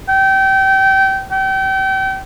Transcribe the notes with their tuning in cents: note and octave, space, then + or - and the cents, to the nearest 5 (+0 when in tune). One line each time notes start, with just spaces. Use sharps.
G5 -25
G5 -35